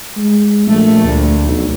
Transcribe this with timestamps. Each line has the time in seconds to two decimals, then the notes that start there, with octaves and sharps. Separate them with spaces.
0.17 G#3
0.67 A#1 A3
1.05 D2
1.45 B1